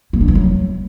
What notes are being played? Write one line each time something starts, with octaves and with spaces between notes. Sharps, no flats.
A#3
D4
E3
F#3